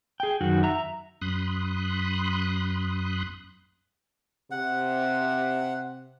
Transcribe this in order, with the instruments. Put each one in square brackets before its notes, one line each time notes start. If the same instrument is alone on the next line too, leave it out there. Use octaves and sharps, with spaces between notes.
[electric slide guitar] G#4 G5
F#2 D#3 F#4
E5 A#5
[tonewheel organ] F#2 B5 C6 D#6 F#6
[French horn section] C3 [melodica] F#5